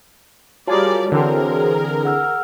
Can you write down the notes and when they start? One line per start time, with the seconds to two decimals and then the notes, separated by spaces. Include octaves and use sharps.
0.67 G3 F4 F#4 G#4 A#4 C#5 D5 A5
1.12 D3 E3 C4 G#4 A#4
2.05 F#5 E6 F6